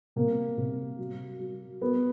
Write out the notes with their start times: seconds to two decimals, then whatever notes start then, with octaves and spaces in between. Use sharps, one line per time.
0.16 C3 A#3
0.57 C3
0.98 F#3
1.39 F#3
1.81 F#3 B3